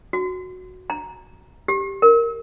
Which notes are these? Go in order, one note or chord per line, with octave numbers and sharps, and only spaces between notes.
F#4
A#5
G4
A#4